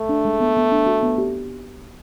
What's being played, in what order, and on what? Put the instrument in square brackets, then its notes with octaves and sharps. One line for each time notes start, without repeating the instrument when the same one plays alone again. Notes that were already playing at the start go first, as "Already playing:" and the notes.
Already playing: [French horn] A3
[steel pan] D4
G#3
B3
B3
D4
F#4
B3
G4